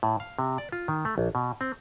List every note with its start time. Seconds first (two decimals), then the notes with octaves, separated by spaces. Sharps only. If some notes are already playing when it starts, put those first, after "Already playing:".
0.03 A2
0.20 F5
0.39 C3
0.58 D5
0.72 F4
0.88 D#3
1.05 A3
1.18 A#1
1.35 B2
1.61 C4